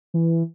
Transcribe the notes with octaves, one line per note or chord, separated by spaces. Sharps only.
E3